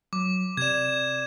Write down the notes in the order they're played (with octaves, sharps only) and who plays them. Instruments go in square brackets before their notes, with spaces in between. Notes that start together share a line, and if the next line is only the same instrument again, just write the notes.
[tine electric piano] F#3 [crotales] D6
[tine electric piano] C3 D5 [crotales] G#6 E7